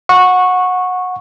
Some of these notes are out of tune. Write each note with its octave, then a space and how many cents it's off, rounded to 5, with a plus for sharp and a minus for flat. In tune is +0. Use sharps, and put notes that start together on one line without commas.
F#5 -20 C#6 -10